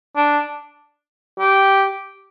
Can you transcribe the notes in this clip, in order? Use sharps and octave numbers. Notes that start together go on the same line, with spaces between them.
D4
G4